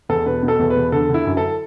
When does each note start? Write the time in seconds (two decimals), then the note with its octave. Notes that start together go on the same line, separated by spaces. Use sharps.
0.09 E2 A4
0.26 B2 B4
0.43 B2
0.48 A4
0.59 E2
0.70 B4
0.76 E2
0.92 D3 A4
1.09 D3
1.14 E4
1.26 F#2
1.37 A4